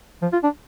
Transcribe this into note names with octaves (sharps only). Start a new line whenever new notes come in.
F3
F4
D4